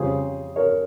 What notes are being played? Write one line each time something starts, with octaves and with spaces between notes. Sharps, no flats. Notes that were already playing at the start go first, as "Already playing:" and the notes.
Already playing: F2 C#3 G3 G#4 C5
A#4 C#5